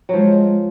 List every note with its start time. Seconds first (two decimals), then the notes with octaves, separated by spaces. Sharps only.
0.09 F3 F#3 G#3